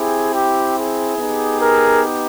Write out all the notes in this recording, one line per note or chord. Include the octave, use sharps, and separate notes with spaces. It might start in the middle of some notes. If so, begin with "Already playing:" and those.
Already playing: C4 E4 G4 G#4
G4
G#4
B3 D#4 G4
G#4 A#4